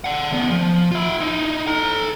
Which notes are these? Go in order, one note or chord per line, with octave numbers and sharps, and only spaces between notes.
D5 F#5
D2 B3
F3
F4 E5
D#4 E4
A4 A#5